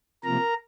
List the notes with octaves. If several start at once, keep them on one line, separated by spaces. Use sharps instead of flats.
C3 F3 A#3 A#4 A#5